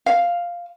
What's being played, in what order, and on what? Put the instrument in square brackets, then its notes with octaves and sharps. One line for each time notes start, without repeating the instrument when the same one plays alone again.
[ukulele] F5